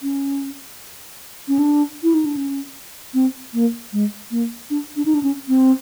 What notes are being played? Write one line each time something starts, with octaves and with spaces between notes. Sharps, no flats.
C#4
C#4
D4
E4
D#4
D4
C#4
C4
A#3
G#3
A#3
D4
D4
D#4
D4
C#4
C4